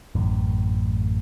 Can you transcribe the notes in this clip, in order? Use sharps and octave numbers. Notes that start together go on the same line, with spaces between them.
A1 F#2